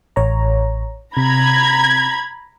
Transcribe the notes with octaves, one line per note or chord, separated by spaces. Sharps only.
A1 C#5 A#5
C3 A#5 B5 G#6